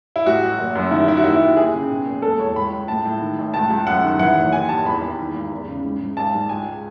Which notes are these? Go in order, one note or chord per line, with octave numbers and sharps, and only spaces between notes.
E4
A1 F#4
A1
F#1
F#2
D#3 E4
D#3 E4
F#4
D#2 E4
D#2
D#2 G#4
C#3
B2
F#1
E1 A4
E2 C#5
C#2 B5
C#2
A2 A5
A2
D#3
A1
C#2 A5
C#2
F#2 F#5
D#3
E3 F#5
F#1
D#2 G#5
D#2 A5
E2 B5
E2
D#3
G#1
E2
C#3
G#2
G#2
G#1 A5
G#2
C#2 G#5